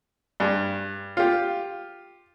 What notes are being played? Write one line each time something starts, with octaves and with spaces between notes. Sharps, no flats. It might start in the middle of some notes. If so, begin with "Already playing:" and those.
G2
F4 G4